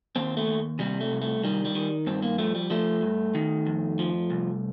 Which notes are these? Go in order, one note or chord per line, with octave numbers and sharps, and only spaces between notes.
D#2 C4
A3
D#2
C3 G3
A3
C2
A3
D#3 G3
G3
D#3
G2 C4
A#3
F3 A3
G3
F3 A3
G2
D#3
F2
F3
C2